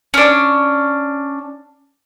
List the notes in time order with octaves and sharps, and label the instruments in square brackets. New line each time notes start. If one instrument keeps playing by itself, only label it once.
[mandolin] C#4 D4